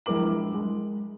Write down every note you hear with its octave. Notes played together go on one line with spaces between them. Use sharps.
A#1 G#3 E4 A#4 D6 F#7
G#3